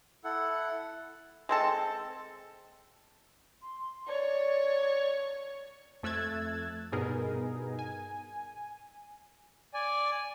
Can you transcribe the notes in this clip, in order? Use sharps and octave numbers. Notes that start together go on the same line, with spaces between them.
E4 A4 F#5
G#3 C4 A4
C6
C#5 D5
F2 A3 E6 F#6 G#6 A6
G2 B2 B3 D#4 G#4 A#4
G#5
D5 G#5